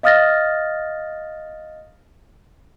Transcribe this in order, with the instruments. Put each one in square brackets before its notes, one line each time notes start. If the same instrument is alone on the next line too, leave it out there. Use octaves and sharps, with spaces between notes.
[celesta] D#5 F5 D#6 F6 A6 A#6